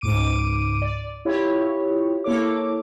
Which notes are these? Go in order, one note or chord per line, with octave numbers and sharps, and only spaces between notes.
C#2 G#2 D6 D7 D#7
D5
E4 F4 G4 C#5
A#3 E4 A4 C#5 D6